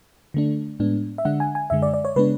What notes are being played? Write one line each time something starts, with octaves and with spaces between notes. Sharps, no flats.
D3 A3 D4
A2 G#3 B3 D4
E5
D3 G#3 D4 F#5
G#5
G#5
F#2 D3 G#3 E5
D5
D5
C#5
C#3 G#3 B3 D4 B4